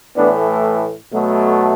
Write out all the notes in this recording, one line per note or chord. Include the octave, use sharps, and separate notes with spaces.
A2 E3 A3 B3 D4
B2 F#3 A3